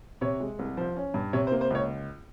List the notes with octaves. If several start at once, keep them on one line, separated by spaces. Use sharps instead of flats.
C3 C#5
G#3
C2
F3 C5
C#4
G2
C3 C#5
C5
A#3
C5
C#2 C#5